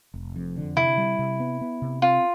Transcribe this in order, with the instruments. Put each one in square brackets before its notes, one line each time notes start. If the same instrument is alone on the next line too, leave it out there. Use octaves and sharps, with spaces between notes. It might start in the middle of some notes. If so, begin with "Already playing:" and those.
[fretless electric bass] F1
F2
D3
[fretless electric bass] C3 [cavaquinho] E4
[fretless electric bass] G3
C3
B3
B3
C3
[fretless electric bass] C4 [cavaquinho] F4